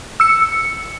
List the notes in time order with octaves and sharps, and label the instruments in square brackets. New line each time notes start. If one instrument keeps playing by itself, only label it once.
[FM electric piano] E6 C#7